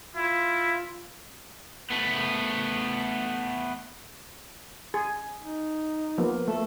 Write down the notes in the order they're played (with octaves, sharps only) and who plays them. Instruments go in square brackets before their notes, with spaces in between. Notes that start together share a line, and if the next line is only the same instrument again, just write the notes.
[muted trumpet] E4 [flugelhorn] F4
[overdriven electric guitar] A3 B3
[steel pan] G#4
[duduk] D#4
[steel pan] F3 A#3 B3
[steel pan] A3 [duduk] A4